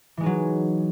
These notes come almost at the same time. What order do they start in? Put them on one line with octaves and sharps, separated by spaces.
E3 G#3 D#4 F#3